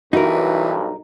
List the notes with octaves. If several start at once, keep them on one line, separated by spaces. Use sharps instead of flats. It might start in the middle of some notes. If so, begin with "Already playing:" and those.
B1 G2 E3 D#4 F#4 A#4